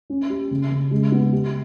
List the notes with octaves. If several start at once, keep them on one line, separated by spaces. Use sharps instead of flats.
C#4
G4
C#3
C#3
G#3
B3
G4